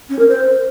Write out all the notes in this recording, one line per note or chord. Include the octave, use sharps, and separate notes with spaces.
C#4
A#4
C5